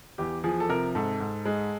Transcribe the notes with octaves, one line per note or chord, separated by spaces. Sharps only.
E2 G4
F3 G#4
A4
C3 A#4
G#2 A4
G#2
G#3